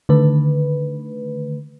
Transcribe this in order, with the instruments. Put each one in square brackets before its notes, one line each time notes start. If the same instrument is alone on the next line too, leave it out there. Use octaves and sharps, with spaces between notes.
[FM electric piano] D3 D#3 A3 B4